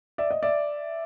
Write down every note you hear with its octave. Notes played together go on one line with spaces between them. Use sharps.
D5 E5
D#5
D5 E5